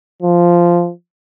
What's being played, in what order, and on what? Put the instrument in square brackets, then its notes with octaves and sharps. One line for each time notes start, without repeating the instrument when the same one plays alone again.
[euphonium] F3